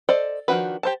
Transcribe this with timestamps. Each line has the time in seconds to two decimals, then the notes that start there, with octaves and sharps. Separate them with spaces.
0.09 A4 C5 D5 D#5
0.48 D#3 F3 D4 F#4 B4
0.83 G4 C5 A5